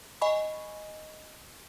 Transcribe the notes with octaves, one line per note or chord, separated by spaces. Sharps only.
D#5 G#5 B5 C#6